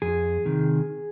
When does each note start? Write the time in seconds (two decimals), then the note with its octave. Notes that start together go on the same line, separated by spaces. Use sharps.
0.02 F2 G#4
0.45 C3 D#3